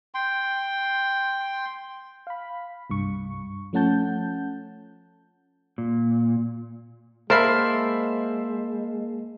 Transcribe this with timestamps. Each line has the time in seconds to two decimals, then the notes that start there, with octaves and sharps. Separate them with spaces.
0.14 G5 C6
2.27 F5 B5
2.90 C2 G2 C#6
3.73 F3 A3 C#4 F#5 A5 G6
5.78 A#2
7.30 G#3 A#3 A#4 C5 E5 A5 B5 C7